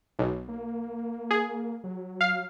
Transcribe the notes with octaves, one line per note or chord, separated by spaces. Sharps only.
B1
A#3
G#4
F#3
F5